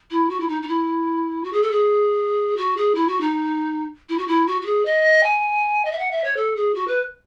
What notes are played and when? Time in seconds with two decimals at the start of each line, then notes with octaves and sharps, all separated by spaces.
0.10 E4
0.29 F#4
0.40 E4
0.48 D#4
0.62 D#4
0.68 E4
1.44 F#4
1.52 G#4
1.62 A4
1.71 G#4
2.56 F#4
2.77 G#4
2.95 E4
3.08 F#4
3.20 D#4
4.09 E4
4.18 F#4
4.27 E4
4.47 F#4
4.61 F#4
4.65 G#4
4.85 D#5
5.23 G#5
5.85 D#5
5.91 E5
5.98 F#5
6.11 E5
6.24 C#5
6.36 A4
6.56 G#4
6.74 F#4
6.87 B4